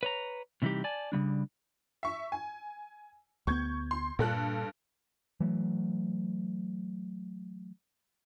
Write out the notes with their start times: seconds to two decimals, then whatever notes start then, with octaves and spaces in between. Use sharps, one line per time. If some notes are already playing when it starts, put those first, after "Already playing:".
0.03 B4 C#5 A#5
0.62 A2 C3 E3 G3 D#4 G4
0.84 D5 G#5 A5
1.12 C#3 F3 G3 D4
2.03 E5 C#6
2.32 G#5
3.47 D2 B3 C#6 G6 G#6
3.91 C6
4.19 G2 A#2 A4 F#6
5.40 E3 F#3 A3